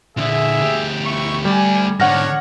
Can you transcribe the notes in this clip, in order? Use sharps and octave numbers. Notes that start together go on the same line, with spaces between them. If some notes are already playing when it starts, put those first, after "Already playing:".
A#2 D3 G#4 E5
D2 G4
E4 C#6
G3 A3 D5 G#5
G#2 D3 D4 C#5 F#5 F6 A#6